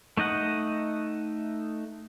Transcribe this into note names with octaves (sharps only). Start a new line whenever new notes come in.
A3 D#4 D#5 F#5